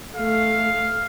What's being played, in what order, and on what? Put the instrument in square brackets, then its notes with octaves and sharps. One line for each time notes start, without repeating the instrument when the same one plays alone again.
[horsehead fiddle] A3 [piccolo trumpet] F5